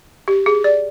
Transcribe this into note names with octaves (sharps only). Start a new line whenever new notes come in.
G4
G#4
D5